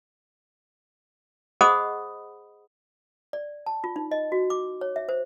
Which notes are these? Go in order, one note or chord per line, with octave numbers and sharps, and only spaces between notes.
G#4 C5 D#5 F#5 B5 D#6
D5
A5
F4
D#4
D#5
F#4
D6
C#5
E5
C5